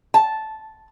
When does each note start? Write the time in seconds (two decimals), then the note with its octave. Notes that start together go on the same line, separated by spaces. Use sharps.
0.14 A5